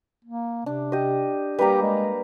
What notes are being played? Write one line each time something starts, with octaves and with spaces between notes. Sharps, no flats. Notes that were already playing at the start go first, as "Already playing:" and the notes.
A#3
C3 D4
G4 D#5
G3 A#3 G4 B4 A#5
G#3